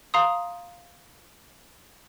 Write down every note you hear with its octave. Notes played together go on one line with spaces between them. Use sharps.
F5 A#5 C6 D#6